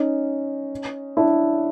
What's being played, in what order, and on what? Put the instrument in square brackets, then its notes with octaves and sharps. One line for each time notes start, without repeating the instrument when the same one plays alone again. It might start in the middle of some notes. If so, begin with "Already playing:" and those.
Already playing: [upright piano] C#4 D#4
D4 E4